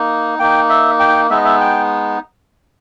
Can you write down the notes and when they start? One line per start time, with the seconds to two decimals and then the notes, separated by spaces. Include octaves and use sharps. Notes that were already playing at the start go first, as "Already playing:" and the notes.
Already playing: A#3 D#4
0.39 A#3 D#4 G5
0.69 E5
1.00 G5
1.30 G#3 B3 D#4 E5
1.37 D#5
1.44 E5
1.60 G5